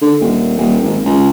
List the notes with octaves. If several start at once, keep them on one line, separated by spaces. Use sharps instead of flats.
D3
D#1
D#1
G#1
C#2